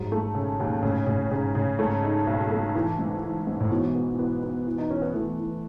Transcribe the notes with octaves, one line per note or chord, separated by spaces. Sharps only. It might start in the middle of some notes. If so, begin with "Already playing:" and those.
Already playing: G#2 F#3
A3
C#3
D#2
A2 C#3
A2 C#3
G#2 C#3
A2 C#3
G#2 A3
D#4
B1
A3
E3
G#2
E3
G#2
A2
B2 E3
B3
B3
B3
E3
D#4
E3 C#4
B3
E3 A3
E3